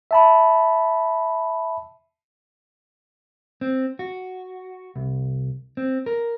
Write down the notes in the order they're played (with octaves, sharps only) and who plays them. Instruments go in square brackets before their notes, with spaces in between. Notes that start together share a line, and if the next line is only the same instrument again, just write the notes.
[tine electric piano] E5 A5 B5
[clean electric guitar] C4
F#4
C2
C4
A#4